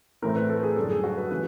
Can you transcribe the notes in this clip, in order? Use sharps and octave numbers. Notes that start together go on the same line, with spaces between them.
A2 E3 A3 C4 A#4
B4
A4
G#4
F#2 D3 G3 A4
G#4
F#4
B4
C#3 E3 A3 B4